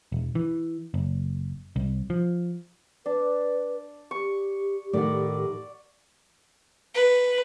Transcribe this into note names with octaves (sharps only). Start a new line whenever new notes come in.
E1
E3
F#1
C2
F3
D4 B4
G4 C#6
A2 D#3 D5 F#5
B4